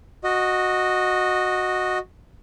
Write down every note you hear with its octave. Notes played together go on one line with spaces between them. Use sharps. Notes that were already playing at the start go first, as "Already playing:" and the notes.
F#4 D#5